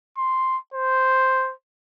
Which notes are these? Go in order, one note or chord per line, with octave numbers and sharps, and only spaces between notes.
C6
C5